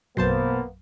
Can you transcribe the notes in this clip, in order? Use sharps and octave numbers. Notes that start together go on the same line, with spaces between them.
A#1 F#2 B2 F#3 A#3 B3 C5 A5